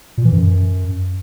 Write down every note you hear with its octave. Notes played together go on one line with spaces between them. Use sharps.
A#2
E3
F#2